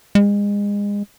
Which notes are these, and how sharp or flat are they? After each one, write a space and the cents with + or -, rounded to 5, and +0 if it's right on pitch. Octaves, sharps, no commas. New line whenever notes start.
G#3 -30